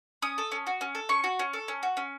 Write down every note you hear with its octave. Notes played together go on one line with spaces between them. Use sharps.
C#4 D#6
A4
C#4
F#4
C#4
A4
C#4 C#6
F#4
C#4
A4
C#4
F#4
C#4